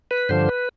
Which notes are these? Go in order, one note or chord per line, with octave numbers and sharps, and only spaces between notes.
B4
G2 D3 F3 C5
B4